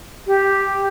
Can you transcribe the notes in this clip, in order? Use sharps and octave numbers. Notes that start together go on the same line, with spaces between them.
G4